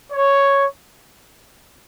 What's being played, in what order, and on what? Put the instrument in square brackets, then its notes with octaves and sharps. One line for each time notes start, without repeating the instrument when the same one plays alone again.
[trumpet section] C#5